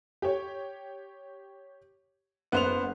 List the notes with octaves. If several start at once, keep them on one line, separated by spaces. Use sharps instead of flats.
G4 C#5
F#1 B3 C5 F#6 F7